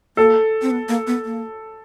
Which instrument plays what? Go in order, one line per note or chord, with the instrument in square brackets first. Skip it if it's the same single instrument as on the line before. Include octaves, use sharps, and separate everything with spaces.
[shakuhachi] A#3 [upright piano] A4
[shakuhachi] C4
B3
A#3
B3
A#3